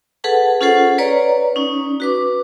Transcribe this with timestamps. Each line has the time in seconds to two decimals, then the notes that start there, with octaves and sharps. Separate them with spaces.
0.24 G#4 A4 B4 F#5 A5
0.61 C#4 F4 G#4 A4 C5 F#5
0.98 B4 C#5 D5 A#5
1.56 C#4 D#4
2.00 F#4 B4 D6